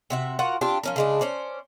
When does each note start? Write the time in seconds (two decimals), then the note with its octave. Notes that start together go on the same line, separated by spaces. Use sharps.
0.10 C3 F#4 E5
0.39 F4 F#4 A#4 F#5
0.61 C4 D4 F4 G4
0.83 F3 C#4 A#4
0.96 C#3 G#3 D4
1.21 C#4 C5 D5